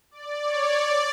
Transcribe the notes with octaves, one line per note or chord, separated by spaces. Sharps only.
D5
C#5
D5